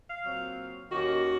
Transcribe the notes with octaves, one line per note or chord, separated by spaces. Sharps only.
F5
A#2 F#3 C4
D#2 D#3 A#3 C#4 F#4